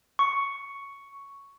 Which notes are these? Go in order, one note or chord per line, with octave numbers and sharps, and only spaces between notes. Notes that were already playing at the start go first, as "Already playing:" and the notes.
C#6